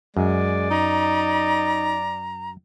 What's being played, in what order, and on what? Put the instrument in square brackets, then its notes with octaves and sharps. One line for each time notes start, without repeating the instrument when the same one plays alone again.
[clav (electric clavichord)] F#2 [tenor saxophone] G#3 [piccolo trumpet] D5
[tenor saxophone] D#4 [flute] A#5